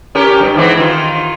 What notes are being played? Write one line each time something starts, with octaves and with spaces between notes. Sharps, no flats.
C#4 G4 A#4
G2
G#2 E3 C4
D#3 F4